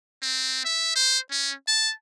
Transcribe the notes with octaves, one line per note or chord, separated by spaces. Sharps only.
C4
E5
C5
C#4
A5